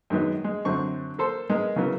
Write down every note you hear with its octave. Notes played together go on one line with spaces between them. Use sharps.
F#2 D#3 G#3 B3
G#3
F#2 D3 C4 C#6
A#3 A4 C5
G#3 B3 A#4
C#3 E3 F#3 A#3 B3